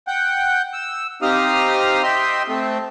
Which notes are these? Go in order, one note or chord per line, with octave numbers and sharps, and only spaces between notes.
F#5 G5
E6
C4 D#4 G4 F5 D#6 F6
D#5 E5 G5 C6
A3 C4